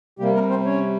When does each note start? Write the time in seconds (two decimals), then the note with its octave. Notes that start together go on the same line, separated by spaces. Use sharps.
0.19 C3 G3 A#3 G4
0.35 A#3 A#4
0.50 C4 C5
0.66 C#4 C#5